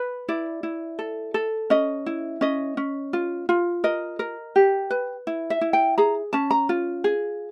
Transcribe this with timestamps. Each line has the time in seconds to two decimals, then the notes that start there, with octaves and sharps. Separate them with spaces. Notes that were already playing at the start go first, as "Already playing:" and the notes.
Already playing: B4
0.28 E4 D5
0.63 E4
0.99 A4
1.34 A4
1.70 C#4 D#5
2.06 E4
2.41 C#4 D#5
2.77 C#4
3.13 F4
3.49 F4
3.84 A#4 D#5
4.19 A#4
4.56 G4
4.90 B4
5.27 E4
5.50 E5
5.61 E4
5.73 G5
5.98 G#4 A#5
6.33 C#4 A5
6.51 A#5
6.69 F4
7.04 G#4